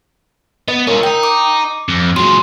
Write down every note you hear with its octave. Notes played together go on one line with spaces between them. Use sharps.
B3 D#5
C#4 F4 A#4
D#5 G5 A#5
D6
F2
F#3 G#3 C6